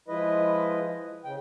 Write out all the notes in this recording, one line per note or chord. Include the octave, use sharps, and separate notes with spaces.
F3 G#3 E4 B4 D#5
C#3 G5